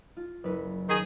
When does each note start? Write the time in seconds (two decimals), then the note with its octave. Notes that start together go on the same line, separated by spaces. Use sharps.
0.17 F4
0.44 F#1 B4
0.89 D#3 G#4